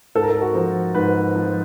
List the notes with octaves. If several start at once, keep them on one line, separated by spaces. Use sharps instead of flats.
G#2 A4
A#4
A4
F#4
F3
G#2 B4
F3